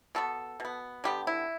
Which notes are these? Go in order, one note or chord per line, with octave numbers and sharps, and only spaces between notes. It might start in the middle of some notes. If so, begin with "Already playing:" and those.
B2 B3 A4
B2 B3
D3 G3 B3 G4
E4